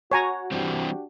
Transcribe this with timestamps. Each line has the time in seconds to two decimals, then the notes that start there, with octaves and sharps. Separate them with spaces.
0.11 F#4 C#5 G#5 A#5
0.52 E3 G3 C4 D4 F#4 G4